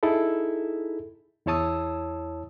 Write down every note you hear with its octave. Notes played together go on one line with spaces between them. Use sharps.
D#4 E4 G#4 A4
E2 E4 C#5 A5 D#6 E6